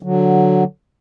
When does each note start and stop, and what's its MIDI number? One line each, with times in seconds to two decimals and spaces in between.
0.03 0.64 50
0.03 0.64 54